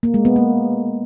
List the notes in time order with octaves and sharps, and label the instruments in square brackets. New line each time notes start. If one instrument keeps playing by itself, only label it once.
[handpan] A#3
G#3
B3
A#3